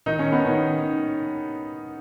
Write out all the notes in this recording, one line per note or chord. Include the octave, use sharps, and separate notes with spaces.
D#3 D#4
C#4
B3
D#3 C#4